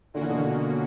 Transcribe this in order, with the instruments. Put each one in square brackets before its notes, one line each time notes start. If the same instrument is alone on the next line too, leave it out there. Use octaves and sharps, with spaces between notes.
[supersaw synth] A#2 A#3 C#4 F#4 [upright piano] D3
[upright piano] E3
B2 D3